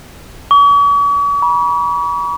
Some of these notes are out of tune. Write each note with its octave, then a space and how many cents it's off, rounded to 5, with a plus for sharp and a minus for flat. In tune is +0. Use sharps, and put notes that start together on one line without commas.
C#6 +45
B5 -40